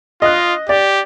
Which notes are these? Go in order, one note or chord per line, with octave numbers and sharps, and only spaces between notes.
F4 D#5 F#6
G4 D5